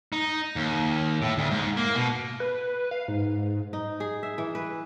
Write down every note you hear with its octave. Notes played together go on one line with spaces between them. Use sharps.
D#4
D#2
A2
D2
G#2
A#3
B2
B4
F5
G#2
D#4
G#4
E5
E3
B4